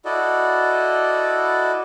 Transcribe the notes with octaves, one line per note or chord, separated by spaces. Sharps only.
E4 F#4 A4 D5 D#5